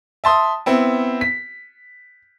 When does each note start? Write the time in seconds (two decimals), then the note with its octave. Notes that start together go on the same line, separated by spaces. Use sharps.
0.24 E5 A5 C6 D#6
0.66 B3 C4 E4
1.21 B6